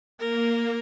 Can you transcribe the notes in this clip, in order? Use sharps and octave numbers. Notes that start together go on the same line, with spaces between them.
A#3 A#4